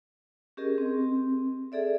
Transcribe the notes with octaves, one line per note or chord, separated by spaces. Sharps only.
C#4 G4 G#4 A#4 D#5
C4
G#4 A4 D5 E5